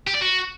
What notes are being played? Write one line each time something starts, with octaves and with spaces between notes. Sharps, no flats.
G4
D5
F#4